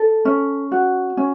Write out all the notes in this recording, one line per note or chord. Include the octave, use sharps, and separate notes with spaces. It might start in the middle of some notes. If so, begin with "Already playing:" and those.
Already playing: A4
C#4
F#4
C#4